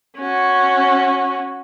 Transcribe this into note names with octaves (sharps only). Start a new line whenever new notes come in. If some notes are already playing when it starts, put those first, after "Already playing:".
C#4 F#4